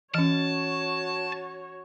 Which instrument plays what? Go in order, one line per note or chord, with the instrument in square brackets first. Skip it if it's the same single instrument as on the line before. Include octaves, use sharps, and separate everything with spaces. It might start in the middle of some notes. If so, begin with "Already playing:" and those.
[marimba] E3 C#4 [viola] F#4 C#5 [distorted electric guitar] A5